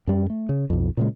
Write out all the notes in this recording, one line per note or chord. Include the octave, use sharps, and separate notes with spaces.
F#2 G3
A3
C#3
B1 F2
A#2 C#3 G#3